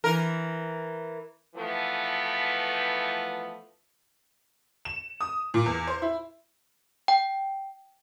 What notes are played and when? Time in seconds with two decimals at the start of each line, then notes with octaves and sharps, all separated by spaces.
0.04 E3 A#4
1.55 E3 F3 A3 B3
4.85 E7
5.21 D#6
5.54 A#2
5.66 E2
5.87 C5
6.02 E4
7.08 G5